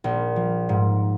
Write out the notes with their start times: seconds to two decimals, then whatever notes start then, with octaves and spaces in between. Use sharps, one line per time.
0.04 A#1
0.36 F3
0.69 G#2